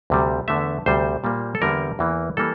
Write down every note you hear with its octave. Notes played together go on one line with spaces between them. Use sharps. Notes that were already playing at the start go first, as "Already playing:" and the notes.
D2 C3 G3
E2 D3 A3 E5
D2 C3 G3 C5
A#2 G3 A#3
A4
E2 D3 G3 A#3 A#4
E2 E3 A#3
E3 G3 A#3 A4